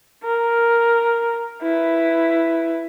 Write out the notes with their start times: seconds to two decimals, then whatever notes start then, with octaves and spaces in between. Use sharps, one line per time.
0.24 A#4
1.63 E4 B4